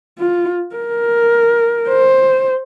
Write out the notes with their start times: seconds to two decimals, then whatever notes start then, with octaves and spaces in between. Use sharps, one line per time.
0.19 F4
0.75 A#4
1.88 C5